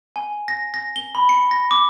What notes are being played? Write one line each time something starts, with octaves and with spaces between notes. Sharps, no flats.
G#5
A#6
A#6
G7
B5
C#7
A#6
D6